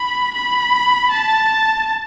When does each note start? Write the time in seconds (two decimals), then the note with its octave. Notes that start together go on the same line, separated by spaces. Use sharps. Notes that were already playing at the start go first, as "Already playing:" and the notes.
Already playing: B5
0.34 B5
1.11 A5